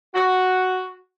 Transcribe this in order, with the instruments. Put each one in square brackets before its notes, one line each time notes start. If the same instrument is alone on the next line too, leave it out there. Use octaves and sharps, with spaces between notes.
[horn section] F#4